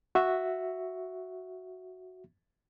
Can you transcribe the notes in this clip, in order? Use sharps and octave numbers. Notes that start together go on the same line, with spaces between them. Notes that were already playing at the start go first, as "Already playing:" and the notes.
F#4 E5